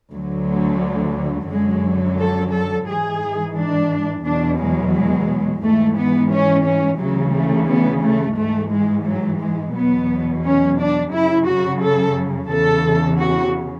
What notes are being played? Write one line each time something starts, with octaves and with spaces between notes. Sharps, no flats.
D2 D3 F#3
F#2 D3 F#3 G#3
A4
A4
G#2 E3 G#4
D4
E2 B2 F#3 D4
G#3
G#3
G#2 E3 A3
B3
C#4
C#4
D2 C#3 E3 F#3
A3
B3
A3
G#2 E3 A3
G#3
F#3
G#3
E2 B2 F#3 B3
C#4
D4
F#2 C#3 F#3 E4
F#4
A4
E2 C#3 E3 A4
F#4